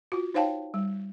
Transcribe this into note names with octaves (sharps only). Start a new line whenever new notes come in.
F4 F#4
D#4 C5 C#5 F5 G5 A5
G3